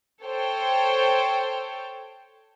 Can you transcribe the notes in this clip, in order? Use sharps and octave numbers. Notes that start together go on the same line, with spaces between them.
A4 C5 C#5 G5